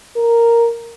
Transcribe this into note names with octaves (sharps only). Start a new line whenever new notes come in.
A#4